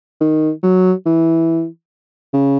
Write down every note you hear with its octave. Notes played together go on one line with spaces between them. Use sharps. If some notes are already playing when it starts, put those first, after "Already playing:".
D#3
F#3
E3
C#3